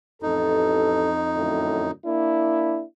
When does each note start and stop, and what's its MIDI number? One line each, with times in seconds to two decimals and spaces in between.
0.22 1.16 33
0.22 1.91 41
0.22 1.91 63
0.22 1.16 69
1.37 1.90 42
1.37 1.90 45
1.37 1.90 50
2.06 2.83 58
2.06 2.83 62
2.06 2.83 64